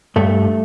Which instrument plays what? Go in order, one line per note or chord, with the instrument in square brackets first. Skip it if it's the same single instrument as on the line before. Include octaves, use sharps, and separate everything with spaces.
[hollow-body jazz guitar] G2 A3